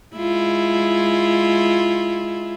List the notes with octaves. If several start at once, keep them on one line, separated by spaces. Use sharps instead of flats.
G#3 E4 F4